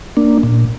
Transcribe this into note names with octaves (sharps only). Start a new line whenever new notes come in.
A#3 D4
A#2